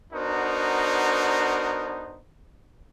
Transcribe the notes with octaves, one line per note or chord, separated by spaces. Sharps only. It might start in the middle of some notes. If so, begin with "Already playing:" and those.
B3 D4 D#4 F#4 A#4 C5